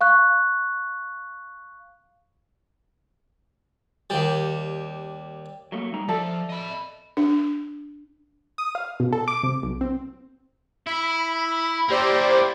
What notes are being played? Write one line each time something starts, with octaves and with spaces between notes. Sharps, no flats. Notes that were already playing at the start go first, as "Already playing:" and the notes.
F5 C#6 F#6
D#2 G3
F#3 A3 A#3
G3 D#4 A#5
F3 A4 D5 E5
D#5 B5
D4
D#6
F5
B2
A4
D6
C3
B1
C4
E4 B5
A#3 E4 G4 C5 D5